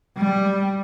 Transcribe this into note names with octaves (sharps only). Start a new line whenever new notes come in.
G3